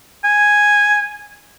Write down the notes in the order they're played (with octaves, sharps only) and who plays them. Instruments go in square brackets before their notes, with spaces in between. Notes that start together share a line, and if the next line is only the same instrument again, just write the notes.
[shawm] G#5